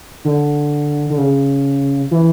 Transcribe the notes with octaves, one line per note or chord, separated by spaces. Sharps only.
D3
D3
C#3
E3